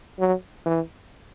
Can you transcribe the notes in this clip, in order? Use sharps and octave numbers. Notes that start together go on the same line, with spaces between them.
F#3
E3